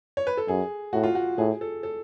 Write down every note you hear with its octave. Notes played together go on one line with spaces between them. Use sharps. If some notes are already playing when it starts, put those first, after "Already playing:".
C#5
B4
A4
F#2 G#4
A2 F#4
F4
F#4
A2 G#4
A4
A4